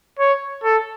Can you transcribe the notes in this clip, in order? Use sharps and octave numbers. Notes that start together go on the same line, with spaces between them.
C#5
A4